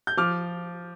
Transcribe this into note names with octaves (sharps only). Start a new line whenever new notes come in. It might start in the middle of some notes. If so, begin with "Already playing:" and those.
G6
F3 D6 F6